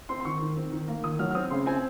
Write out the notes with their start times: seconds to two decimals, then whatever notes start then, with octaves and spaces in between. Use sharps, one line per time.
0.09 C4 C6
0.20 C6
0.25 D#3 C#6
0.41 D#3
0.56 C4
0.72 D#3
0.88 A#3
1.03 D#3 D#6
1.19 F#3 F6
1.31 F6
1.35 C4 D#6
1.50 C#3 C6
1.66 C4 G#5